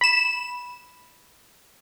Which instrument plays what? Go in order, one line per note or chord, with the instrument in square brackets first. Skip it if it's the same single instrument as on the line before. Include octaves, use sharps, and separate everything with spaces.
[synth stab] B5 E7